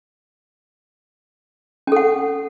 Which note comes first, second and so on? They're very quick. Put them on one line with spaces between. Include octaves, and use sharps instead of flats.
C#4 A4 F#5